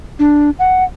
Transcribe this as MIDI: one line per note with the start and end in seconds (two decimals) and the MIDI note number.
0.19 0.50 62
0.59 0.84 78